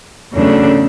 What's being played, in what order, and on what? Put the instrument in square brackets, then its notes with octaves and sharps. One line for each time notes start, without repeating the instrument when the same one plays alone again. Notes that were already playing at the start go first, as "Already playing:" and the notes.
[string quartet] E2 C#3 F#3 A3 D4